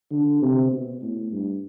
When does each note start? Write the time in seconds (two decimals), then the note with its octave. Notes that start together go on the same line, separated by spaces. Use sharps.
0.11 D3
0.42 C3
0.71 B2
1.02 A2
1.31 G2